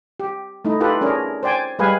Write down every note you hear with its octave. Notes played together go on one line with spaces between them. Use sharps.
G4
A3 D#4 E4
E4 F4 G4 A4 B4
C#4 D4 G#4 A#4
C5 D5 G5 G#5
G3 G#3 B4 F5 G#5